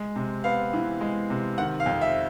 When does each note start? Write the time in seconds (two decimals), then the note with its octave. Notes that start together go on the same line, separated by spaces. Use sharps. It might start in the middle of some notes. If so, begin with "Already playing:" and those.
Already playing: G#3
0.16 C3
0.44 B3 F5
0.73 E3
1.01 G#3
1.30 C3
1.58 D#3 F#5
1.80 F5
1.86 F2
2.01 E5